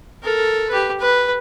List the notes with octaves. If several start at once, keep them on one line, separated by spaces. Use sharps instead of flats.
A4 A#4
G4 B4
B4